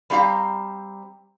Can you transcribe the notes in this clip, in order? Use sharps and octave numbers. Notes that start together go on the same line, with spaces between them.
G3 A3 C4 G4 F5 A#5